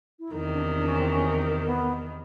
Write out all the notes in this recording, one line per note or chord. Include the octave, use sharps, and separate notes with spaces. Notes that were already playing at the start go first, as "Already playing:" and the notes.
E4
E2 C3 D#3 D#4
D4
D4
C#4
C4
C#4
B3